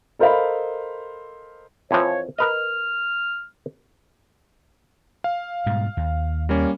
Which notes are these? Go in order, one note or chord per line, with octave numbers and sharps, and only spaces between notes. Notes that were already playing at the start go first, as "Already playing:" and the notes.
A4 A#4 C5 D#5 F5 B5
F2 E3 F3 C#5
A#4 B4 D#5 F6
F5
G#2 B2 G3
D#2
G3 A#3 C#4